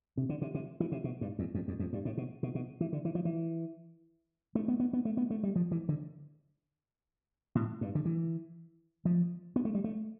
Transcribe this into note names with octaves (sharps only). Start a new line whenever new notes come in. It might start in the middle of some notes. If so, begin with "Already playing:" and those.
C3
D3
C3
C3
E3
C3
B2
G2
E2
F2
F2
F2
G2
A2
B2
B2
B2
E3
D3
E3
F3
E3
A3
B3
B3
B3
A3
B3
A3
G3
F3
E3
D3
A2
G2
D3
E3
F3
B3
A3
G3
A3